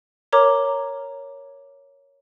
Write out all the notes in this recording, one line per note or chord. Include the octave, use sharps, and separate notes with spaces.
A#4 C#5 A#5 D6